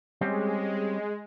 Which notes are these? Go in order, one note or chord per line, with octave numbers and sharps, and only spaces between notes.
G3 G#3 C4 C#4